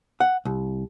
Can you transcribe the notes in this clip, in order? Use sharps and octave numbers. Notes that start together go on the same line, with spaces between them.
F#5
C2